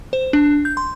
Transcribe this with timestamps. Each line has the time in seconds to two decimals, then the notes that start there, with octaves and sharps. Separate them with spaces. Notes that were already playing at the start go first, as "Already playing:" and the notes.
0.13 C5
0.33 D4
0.65 G6
0.77 C6